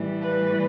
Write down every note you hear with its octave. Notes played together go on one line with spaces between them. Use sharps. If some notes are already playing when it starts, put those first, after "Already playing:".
Already playing: A2 E3 G3
B4